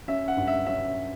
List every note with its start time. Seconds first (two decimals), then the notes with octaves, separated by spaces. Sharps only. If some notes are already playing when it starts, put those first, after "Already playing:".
0.08 C#4 E5
0.28 F#5
0.37 G2
0.47 E5
0.67 C#4 E5